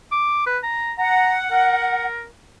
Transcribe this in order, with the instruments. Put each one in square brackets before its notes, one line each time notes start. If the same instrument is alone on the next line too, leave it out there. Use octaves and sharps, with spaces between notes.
[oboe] D6
B4
A#5
[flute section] F#5 [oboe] A#5
[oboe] A#4